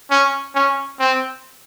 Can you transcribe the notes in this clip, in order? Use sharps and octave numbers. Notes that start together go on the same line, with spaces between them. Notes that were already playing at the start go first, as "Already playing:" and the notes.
C#4
C#4
C4